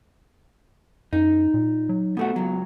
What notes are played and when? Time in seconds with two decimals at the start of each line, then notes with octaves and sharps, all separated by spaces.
1.13 F#2 D#4
1.54 A#2
1.89 F#3
2.17 B2 A3 B3 F#4
2.36 C#2 F#3